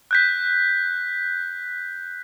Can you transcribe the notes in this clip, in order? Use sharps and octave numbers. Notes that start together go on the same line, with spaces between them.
F#6 G6 B6